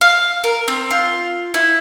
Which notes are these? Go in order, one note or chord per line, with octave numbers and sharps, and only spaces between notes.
F5
A#4
C4
F4
E4